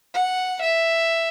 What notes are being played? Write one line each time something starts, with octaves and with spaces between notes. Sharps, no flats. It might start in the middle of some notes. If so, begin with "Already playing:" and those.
F#5
E5